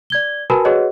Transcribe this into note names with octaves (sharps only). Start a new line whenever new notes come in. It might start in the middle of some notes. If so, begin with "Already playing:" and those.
D5 G#6 G7
F#4 A#4 B4 G#5 A5 B5
F#4 G#4 B4 C#5 D#5 F#5